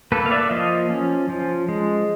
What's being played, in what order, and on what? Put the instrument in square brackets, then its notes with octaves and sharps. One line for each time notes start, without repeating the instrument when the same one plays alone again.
[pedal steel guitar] A#3 A4 B4
F5
D5 E5
F3 D#5 F5
C#4
F3
G#3